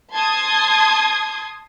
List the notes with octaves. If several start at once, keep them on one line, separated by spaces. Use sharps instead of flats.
A5 C6 D#6 G#6